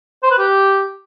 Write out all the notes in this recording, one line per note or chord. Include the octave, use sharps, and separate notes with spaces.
C5
B4
G4